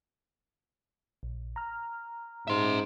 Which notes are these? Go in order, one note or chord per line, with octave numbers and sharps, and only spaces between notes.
A#1
A#5 F6
G#2 E5 C6